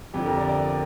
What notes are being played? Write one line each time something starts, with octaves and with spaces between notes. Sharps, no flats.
F2 D3 F3 G4
A#4
D5
D5